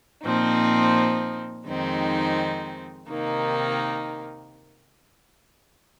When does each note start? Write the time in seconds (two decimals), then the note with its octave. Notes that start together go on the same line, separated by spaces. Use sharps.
0.24 A#2 F3 C4 D#4
1.66 F2 D#3 G#3 C4 D#4
3.08 C3 D#3 A#3 D#4